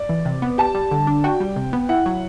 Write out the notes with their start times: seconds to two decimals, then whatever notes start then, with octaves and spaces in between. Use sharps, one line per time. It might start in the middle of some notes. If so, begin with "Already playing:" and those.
Already playing: D5
0.09 E3
0.25 C3
0.42 B3
0.58 G4 A5
0.75 G3
0.91 D3
1.07 D4
1.24 F#4 G5
1.40 G3
1.56 C3
1.73 B3
1.89 E4 F#5
2.06 F#3